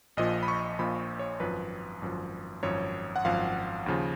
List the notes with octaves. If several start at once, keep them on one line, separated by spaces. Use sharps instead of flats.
A#1 A#2 F3 D#5
B5
C#6
A#1 A#2 F3 B5
C#5
G#1 F#2 F3 B4
G#1 F#2 F3
G#1 F#2 F3 C#5
F#5
G#1 F#2 F3 F5
D#2 C#3 F3